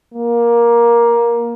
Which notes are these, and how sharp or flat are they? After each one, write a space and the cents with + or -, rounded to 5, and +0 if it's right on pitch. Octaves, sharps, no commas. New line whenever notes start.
A#3 +15